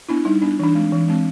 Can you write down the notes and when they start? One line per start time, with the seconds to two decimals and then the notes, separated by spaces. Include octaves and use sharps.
0.09 B3 D4 E4
0.25 G3 D#4
0.42 B3 D4
0.59 E3 D4
0.75 G#3 C4
0.92 E3
1.08 G#3 C4